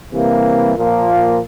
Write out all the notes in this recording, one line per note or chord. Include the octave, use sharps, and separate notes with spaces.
C3 E3 G3 A#3
A#2 F3 A#3